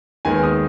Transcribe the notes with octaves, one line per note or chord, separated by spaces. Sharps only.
D#2 D#3 G#3 B3 G#5
D#6